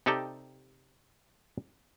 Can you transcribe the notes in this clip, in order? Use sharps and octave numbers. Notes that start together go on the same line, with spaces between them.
C3 D#4 G4 A4 D5 G5